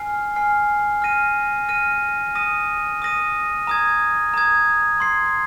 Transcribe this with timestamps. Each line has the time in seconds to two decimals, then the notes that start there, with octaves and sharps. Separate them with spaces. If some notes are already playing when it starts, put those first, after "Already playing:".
Already playing: G#5 F6 C7
0.36 G#5 F6 C7
1.02 F6 A#6 D#7
1.69 F6 A#6 D#7
2.35 D#6 A#6 D#7
3.02 D#6 A#6 D#7
3.67 A#5 D#6 G#6
4.34 A#5 D#6 G#6
5.00 C6 G#6 C7